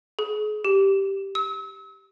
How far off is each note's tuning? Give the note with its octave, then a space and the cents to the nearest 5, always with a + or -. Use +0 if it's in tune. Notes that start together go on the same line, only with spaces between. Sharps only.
G#4 +40
G4 -5
E6 -40